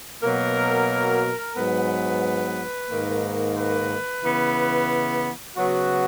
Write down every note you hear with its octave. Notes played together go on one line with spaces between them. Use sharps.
B2 F#3 A#3 A#4
G#2 F#3 B3 B4
G#2 D#3 A#3
B4
C#3 E3 B3
C#3 F#3 B3 F#4